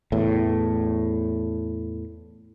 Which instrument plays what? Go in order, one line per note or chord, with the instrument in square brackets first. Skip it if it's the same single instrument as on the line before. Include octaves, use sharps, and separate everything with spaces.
[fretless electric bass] E2 A2